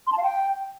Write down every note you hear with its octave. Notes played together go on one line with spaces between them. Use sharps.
C6
A5
F5
G5